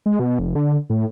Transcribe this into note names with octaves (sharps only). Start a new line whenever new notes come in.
G#3
B2
F1
D3
A2